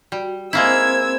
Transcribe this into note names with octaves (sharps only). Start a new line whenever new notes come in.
G3 F#4
G#3 A#3 C4 E4 A#4 C5 E6 G#6